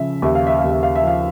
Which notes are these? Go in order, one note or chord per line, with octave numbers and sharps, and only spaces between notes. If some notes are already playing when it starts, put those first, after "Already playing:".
Already playing: C#3 F3 E5
D#2 E5
F5
E5
D#2 F5
E5
F5
E5
F3 F5